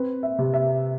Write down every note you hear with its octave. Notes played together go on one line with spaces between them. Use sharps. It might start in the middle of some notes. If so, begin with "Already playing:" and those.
Already playing: C4 B4
E5
C3
E5